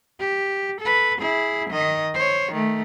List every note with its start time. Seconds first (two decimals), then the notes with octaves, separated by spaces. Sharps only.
0.20 G4
0.81 A4 B4
1.18 E4 G#4
1.70 D#3 D#5
2.14 C5 C#5
2.52 D#3 A3